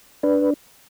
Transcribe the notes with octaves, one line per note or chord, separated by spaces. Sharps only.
D4 B4